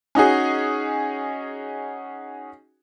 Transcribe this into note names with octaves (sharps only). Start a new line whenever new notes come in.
C#4 D#4 F#4 G#4